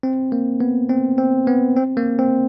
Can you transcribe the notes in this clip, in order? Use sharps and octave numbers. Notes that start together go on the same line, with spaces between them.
C4
A#3
B3
C4
C4
B3
C4
A#3
C4